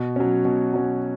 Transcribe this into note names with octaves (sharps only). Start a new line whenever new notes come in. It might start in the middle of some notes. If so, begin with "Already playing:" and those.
Already playing: B2
F#3 C#4
B2
F#3 C#4